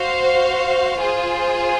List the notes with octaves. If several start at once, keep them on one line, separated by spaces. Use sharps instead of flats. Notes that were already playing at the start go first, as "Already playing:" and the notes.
Already playing: F#4 C5 F5
F4 G#4 C5